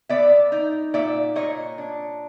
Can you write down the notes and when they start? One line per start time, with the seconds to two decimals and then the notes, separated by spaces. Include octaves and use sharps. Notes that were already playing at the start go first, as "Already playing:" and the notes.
0.09 B3 D5 E5
0.52 D#4
0.94 A#2 D5 E5
1.35 A#2 C#5 D#5
1.78 D4